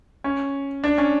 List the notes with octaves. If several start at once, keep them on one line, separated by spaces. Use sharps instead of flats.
C#4
D4
C#4